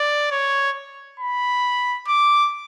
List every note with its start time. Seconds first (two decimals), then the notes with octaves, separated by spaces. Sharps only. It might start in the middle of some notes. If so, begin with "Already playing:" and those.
Already playing: D5
0.31 C#5
1.20 B5
2.07 D6